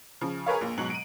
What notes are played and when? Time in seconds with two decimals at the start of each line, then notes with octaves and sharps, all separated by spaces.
0.21 C#3 F3
0.46 G#4 A#4 B4 C#5 F5
0.61 A#1 A#2
0.78 G#2 B2 F#3 F#7
0.90 D7 D#7